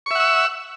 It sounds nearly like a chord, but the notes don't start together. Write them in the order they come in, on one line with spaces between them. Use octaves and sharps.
C#6 E5 F#5 E6